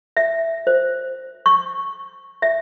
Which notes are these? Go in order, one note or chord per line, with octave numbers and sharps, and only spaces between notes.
E5
C5
C#6
E5